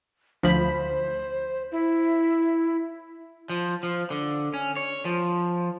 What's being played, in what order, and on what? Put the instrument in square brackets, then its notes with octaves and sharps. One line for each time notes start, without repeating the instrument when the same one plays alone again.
[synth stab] D2 F3 B5 [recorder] C5
[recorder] E4
[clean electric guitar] F3
F3
D3
C#4
C#5
F3